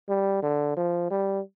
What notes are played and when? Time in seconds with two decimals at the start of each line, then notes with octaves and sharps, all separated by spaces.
0.09 G3
0.42 D3
0.77 F3
1.10 G3